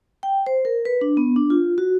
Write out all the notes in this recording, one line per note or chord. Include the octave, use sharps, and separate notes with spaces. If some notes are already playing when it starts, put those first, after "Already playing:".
G5
C5
A#4
B4
D4
B3
D4
F4
F#4